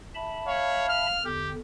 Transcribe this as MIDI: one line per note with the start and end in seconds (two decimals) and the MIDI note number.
0.15 1.06 76
0.15 1.06 81
0.15 1.06 83
0.47 0.85 73
0.47 1.19 77
0.89 1.23 89
1.25 1.54 40
1.25 1.54 50
1.25 1.50 67